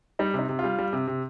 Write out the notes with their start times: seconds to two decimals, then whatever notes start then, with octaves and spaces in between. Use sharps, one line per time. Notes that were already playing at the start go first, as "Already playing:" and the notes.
0.19 G3 D#4
0.34 C3 D#4
0.49 C3
0.59 F4
0.64 G3
0.78 G3
0.93 C3
1.08 C3